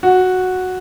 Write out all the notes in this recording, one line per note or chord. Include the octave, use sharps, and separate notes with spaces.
F#4